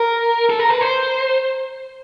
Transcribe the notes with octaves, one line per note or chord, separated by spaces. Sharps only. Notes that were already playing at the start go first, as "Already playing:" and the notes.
Already playing: A#4
A4
A#4
B4
C5